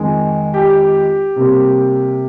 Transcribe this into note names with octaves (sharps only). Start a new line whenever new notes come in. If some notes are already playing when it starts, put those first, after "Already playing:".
Already playing: F2 D#3 G#3
G4
C3 G3 A#3